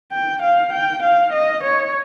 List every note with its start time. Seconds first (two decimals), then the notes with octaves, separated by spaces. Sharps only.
0.12 G5
0.42 F5
0.73 G5
1.03 F5
1.33 D#5
1.64 C#5